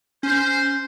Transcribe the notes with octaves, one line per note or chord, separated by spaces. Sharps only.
C#4 C5